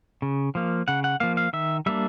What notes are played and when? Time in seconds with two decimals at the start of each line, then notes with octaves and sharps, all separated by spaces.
0.22 C#3
0.55 F3 A#3
0.88 C#3 F#5
1.04 F#5
1.20 F3 A#3 F5
1.37 F5
1.53 D#3 E5
1.86 G3 A#3 D4 E5